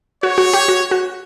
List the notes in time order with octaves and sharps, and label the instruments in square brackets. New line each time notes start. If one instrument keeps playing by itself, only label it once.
[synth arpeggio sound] F#4 [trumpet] C#5
[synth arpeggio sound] F#4
G4
F#4
F#4